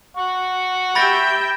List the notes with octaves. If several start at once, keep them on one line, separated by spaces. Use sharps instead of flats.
F#5 C#6
G4 E5 G5 B5 A6 A#6